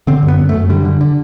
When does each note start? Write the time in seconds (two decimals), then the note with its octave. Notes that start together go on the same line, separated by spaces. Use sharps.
0.07 D3 C4
0.23 F#2
0.28 B3
0.38 F#2
0.49 A3
0.54 F#2
0.69 D3 G3
0.85 D3
1.01 D3